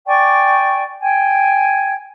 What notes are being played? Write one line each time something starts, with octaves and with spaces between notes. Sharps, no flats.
D5 G5 G#5 C#6
G5 G#5 G#6